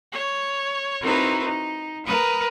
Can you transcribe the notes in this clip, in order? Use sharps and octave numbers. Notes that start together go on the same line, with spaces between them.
C#5
C4 D#4 E4 F#4 A#4 B4
D#4
A#4 B4 D#6